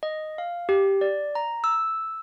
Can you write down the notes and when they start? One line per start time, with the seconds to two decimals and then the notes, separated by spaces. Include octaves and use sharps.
0.03 D#5
0.38 F5
0.69 G4
1.01 D5
1.35 A#5
1.64 E6